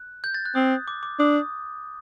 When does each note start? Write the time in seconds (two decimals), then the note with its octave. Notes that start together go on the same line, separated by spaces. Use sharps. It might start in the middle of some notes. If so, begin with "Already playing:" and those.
Already playing: F#6
0.24 G6
0.34 A6
0.45 F#6
0.55 C4 D#6
0.88 D6
1.03 D6
1.20 D4 D#6